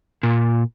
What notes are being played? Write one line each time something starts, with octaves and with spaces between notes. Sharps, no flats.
A#2